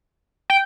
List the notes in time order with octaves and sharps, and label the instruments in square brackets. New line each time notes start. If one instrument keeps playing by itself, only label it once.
[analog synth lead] G5